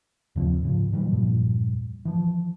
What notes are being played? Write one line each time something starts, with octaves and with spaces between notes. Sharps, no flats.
D#2 C#3 F3 C4
G#2 C#3 F3
A#2 D#3 F#3 G3
E2 G2 A#2 F3
E3 F3